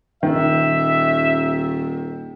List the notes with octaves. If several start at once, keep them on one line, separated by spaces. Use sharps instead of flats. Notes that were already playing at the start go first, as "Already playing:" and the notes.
D#1 D#3 E5